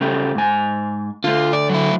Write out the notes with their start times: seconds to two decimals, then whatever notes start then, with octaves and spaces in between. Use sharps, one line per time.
0.01 C#3 A3 G4
0.35 G#2 G#5
1.24 D3 A3 F4
1.53 D5
1.70 F#3 E4